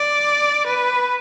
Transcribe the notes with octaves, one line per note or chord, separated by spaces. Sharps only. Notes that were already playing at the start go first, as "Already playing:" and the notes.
Already playing: D5
B4